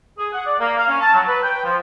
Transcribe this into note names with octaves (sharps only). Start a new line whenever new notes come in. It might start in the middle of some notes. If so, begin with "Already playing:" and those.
G#4
F#5
D5
A#3
F5
C#4
A5
F#3
B4
G5
F3